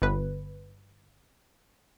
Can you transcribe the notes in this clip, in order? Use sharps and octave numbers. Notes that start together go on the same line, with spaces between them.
G1 B4